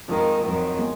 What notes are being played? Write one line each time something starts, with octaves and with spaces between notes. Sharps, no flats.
F2 D#3 F3 G#3
F2 D#3 F#3
G#3